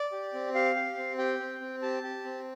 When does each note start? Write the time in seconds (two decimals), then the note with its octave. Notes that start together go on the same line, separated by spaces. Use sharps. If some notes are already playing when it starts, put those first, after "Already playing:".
Already playing: D5
0.12 G4
0.33 C4
0.55 G4 F5
0.76 G4
0.97 C4
1.18 G4 G5
1.40 C4
1.61 C4
1.82 G4 A5
2.03 G4
2.24 C4